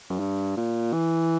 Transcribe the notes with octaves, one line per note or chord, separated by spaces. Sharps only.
F#2
G2
A#2
E3